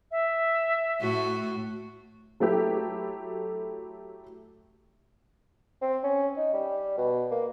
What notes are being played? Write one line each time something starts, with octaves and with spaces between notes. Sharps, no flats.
E5
A2 F#4
F#3 A3 E4 G4
C4
C#4
D#4
G3
B2
A#3